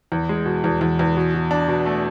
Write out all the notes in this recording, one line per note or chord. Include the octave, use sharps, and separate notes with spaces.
E2
G#3
B2
E2
E2
E2
B2
B2
D4
B2
A3